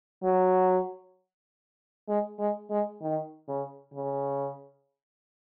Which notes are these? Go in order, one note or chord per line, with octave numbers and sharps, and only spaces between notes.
F#3
G#3
G#3
G#3
D#3
C#3
C#3